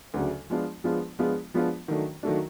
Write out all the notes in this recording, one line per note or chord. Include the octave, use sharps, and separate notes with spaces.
D2 C#3 F#3 A3
F3 G#3 B3 D4 F4
F3 G#3 B3 D4 F4
F3 G#3 B3 D4 F4
F3 G#3 B3 D4 F4
D#3 F#3 A3 D4
D#3 F#3 A3 D4